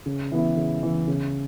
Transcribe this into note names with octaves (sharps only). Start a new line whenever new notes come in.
C#3
E3 B3 E4
C#3
E3 B3 E4
C#3